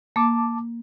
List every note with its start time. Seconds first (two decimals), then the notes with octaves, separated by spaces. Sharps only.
0.16 A#3 A5 D6